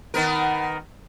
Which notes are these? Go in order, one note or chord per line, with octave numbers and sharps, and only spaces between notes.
D#3 B3 A#4